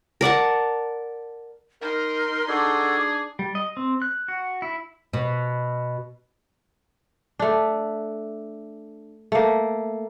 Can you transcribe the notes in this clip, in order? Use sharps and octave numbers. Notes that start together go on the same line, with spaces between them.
A#4 D5 F#5 A5
D#4 A#4 C6
D4 F#4 G#4 A4 D6
G3
D#5
C4
F#6
F#4
E4
B2
A3 D4
A3 A#3